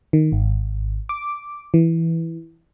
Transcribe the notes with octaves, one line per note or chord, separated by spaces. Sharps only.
D#3
G#1
D6
E3